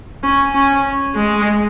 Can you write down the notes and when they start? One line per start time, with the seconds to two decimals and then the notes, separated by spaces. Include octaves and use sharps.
0.23 C#4
0.54 C#4
1.16 G#3